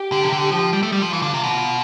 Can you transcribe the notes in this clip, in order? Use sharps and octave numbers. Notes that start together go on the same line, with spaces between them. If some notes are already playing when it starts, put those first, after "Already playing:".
Already playing: G4
D3
C3
D3
F3
G3
A3
G3
F3
E3 F4
D3
C3
B2
F4